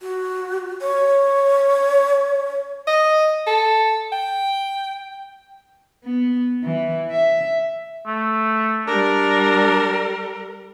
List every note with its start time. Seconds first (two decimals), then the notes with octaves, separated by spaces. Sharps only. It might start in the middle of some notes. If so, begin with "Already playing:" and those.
0.02 F#4
0.81 C#5
2.87 D#5
3.47 A4
4.12 G5
6.04 B3
6.64 E3
7.11 E5
8.07 A3
8.87 G3 D4 A#4